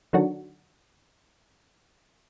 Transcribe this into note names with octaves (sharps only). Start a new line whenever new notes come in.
D3 D#3 F#3 D4 F#4